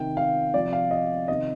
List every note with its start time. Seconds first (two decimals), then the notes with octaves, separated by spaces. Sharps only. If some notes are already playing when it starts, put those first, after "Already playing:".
Already playing: C3 D#3 G5
0.17 F5
0.54 C3 F3 D5
0.73 F5
0.91 D#5
1.28 C3 D#3 D#5